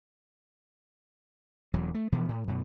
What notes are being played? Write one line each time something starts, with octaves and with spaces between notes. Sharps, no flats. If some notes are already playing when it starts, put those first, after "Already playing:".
E1 E2 F#3
A3
B2 E3 F3 B3
A2
F#2 B2